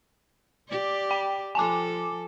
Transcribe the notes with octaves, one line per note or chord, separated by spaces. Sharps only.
G4 D5
G5
F3 A4 G#5 A5 D6